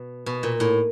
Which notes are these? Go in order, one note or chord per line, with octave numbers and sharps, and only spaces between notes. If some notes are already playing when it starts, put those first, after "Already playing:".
Already playing: B2
B2
A#2
A2